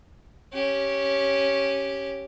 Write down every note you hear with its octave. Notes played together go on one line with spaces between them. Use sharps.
C#4 G4